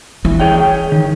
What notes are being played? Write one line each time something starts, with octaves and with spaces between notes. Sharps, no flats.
E3
G#4 C#5 G5
D#3